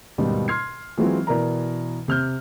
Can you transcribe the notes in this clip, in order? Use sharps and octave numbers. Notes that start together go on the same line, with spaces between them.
D#2 G#2 B2 D#3 G3
C6 F6 G#6 C7
E3 F#3 G#3 C4 F4
B2 E3 A#4 D5 A#5
C3 F6 G6